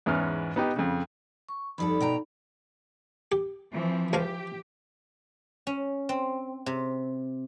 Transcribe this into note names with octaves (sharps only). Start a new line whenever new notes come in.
E2 G#2 B3 C#4 F6
B3 D#4 G4
F2 C#3
C#6
F2 G3 D#4 A4 B5
B2 G5 A#5
G4
E3 F3 C4
C#2 F3 G4 F5
C#4
C4
C3